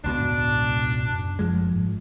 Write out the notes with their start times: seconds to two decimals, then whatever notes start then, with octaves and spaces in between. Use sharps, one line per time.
0.04 E1 C#2 B2 D4
0.20 A2
1.10 F#2
1.39 F#1 F3 G#3
1.74 G#2